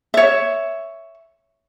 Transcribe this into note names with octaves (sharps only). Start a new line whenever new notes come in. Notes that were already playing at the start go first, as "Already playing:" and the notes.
C#5 E5